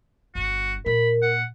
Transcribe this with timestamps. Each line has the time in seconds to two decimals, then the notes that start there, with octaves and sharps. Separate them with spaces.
0.35 G1 G2 F#4
0.86 A#2 A#4 B5
1.22 F#5